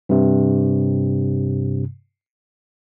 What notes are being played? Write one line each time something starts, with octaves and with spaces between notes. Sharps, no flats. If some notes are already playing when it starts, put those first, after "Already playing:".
G2 C3